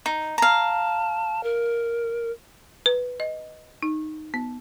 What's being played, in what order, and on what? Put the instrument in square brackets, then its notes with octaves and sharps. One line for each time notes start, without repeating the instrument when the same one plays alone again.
[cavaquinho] D#4
[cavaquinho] F5 A#5 [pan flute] A5
[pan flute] A#4
[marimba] B4
D#5
D#4
B3